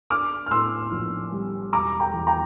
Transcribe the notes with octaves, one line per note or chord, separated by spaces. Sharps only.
D4 D6 F6
F6
A2 C6 E6
A#1
G3
E1 A#5 D6
G5 A#5
E2
G5 A#5